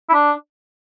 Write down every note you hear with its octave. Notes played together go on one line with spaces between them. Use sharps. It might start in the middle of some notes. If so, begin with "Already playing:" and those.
E4
D4